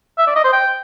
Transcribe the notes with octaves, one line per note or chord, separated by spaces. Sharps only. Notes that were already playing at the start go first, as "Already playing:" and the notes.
E5
D5
D#5
C5
G5